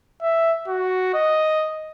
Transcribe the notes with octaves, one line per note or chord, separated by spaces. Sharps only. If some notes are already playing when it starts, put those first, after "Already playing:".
E5
F#4
D#5